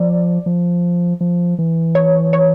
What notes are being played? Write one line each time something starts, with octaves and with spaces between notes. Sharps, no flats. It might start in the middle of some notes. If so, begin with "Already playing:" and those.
Already playing: F3 D5
F3
F3
E3
C#5
C#5